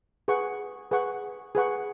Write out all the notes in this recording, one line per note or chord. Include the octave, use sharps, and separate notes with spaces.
G#4 B4 F#5 C#6
G#4 B4 F#5 C#6
G#4 B4 F#5 C#6